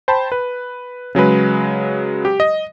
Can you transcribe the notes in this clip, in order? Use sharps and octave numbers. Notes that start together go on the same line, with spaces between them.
C5 G5 A5 B5
B4
C#3 F#3 G#3 B4
G4
D#5